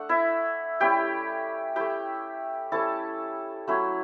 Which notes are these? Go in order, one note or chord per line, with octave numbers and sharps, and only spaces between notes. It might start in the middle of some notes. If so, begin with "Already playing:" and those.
Already playing: A3 D4 F#5
E4 E5
G3 C#4 E4 G4 G5
A3 E4 G4 G5
G3 C#4 E4 A4 A5
F#3 A3 C#4 E4